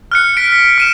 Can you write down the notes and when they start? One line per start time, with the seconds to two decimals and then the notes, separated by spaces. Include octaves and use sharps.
0.12 F6 F#6 C#7
0.37 B6 D7
0.52 B6
0.78 F6 D#7 E7